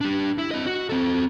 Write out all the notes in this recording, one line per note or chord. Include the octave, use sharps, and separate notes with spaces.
D4 G4
E4
C4 D#5
F#4
C4 A4